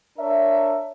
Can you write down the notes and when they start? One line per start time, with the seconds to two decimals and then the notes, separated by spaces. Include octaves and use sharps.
0.18 D4 A#4 C#5 E5